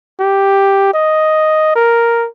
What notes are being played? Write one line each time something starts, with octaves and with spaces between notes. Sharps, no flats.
G4
D#5
A#4